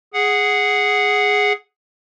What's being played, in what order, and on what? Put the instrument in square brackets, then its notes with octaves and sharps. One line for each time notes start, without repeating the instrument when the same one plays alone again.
[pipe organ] G#4 F#5